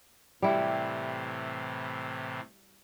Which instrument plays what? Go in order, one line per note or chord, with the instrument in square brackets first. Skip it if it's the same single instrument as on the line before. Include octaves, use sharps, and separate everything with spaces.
[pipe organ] A2 C3 E3 [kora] G3 E4